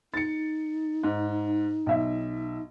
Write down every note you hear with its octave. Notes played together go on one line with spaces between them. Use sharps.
D#4 A6 C#7
G#2
B1 E5